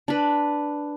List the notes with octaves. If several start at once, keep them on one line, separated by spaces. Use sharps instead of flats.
D4 B4